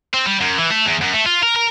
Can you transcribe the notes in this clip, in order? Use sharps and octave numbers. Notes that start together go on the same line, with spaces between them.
C4
G3
F#2
E3
A3
E2
F#2
A3
F4
A#4
A#4